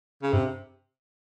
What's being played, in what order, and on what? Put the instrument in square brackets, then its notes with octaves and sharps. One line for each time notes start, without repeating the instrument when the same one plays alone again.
[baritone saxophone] C#3
[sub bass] G2 [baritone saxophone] C3